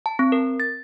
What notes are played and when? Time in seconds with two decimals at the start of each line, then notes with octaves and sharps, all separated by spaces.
0.06 A5
0.19 C4
0.32 A#4
0.60 A6